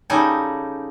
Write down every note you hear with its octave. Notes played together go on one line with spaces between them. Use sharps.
C#3 G3 D#4 A4 G#5